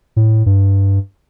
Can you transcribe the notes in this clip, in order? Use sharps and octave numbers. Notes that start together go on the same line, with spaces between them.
A2
G2